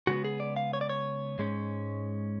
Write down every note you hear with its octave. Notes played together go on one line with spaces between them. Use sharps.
C#3 G#3 B3 F#4
G#4
D5
F5
C#5
D5
C#5
G#2 G#3 C#4